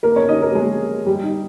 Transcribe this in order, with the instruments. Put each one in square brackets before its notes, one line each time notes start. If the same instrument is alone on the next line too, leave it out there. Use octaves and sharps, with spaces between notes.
[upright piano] A#3 A#4
C#4 C#5
D#4 D#5
A#3 A#4
G#3 G#4
G3 G4
D#4